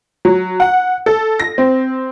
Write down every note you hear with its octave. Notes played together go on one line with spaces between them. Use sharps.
F#3
F#5
A4
A#6
C4